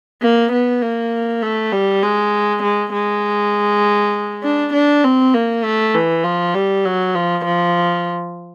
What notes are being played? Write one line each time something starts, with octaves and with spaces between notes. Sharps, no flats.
A#3
B3
A#3
A3
G3
G#3
G#3
G#3
D4
D4
C4
A#3
A3
E3
F3
G3
F#3
F3
F3